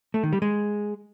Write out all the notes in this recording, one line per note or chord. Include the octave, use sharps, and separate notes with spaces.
A3
D#3
G3
G#3